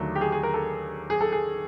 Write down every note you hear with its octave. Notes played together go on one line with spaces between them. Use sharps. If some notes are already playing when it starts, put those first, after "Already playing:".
Already playing: D#2 D3 F#3 A3
G4
G#4
G#4
A#4
A4
G#4
A4
G#4